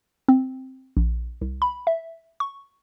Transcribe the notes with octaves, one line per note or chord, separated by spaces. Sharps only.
C4
A#1
C2
B5
E5
C#6